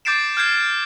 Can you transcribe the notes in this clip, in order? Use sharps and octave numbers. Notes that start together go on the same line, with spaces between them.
D6 G6 A6 C7 D7 E7
F6 G6 G#6 C7